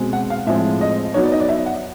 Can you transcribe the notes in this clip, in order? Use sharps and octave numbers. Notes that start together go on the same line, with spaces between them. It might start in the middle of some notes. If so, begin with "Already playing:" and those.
Already playing: B2 G#3 C4
F#5
F5
A2 F3 G#3 C4 E5
D#5
F#3 B3 D#4 C#5
D5
D#5
D5
E5
F#5